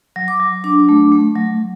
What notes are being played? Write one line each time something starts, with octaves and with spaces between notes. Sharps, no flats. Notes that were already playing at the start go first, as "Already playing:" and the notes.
F#3
D6
F#3
D4 D6
A3
A3
F#3